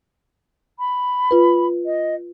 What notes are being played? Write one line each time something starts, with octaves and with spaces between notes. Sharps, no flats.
B5
F4 B4
D#5